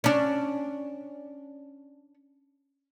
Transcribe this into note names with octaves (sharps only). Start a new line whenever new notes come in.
C#4 D4